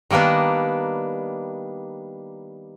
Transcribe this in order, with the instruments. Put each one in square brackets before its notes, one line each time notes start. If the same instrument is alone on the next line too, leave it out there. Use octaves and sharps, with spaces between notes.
[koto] D#3 G3 A#3 B3 D4